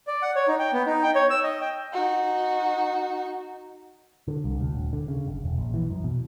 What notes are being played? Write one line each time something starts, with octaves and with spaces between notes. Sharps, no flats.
D5
F#5
C#5
D#4
G5
B3
D#4
G5
C#5
E6
D#5
G5
D#4 F#4
D3
C2
D2
D#1
D3
C#3
F#1
E1
A#1
E3
F#2
B2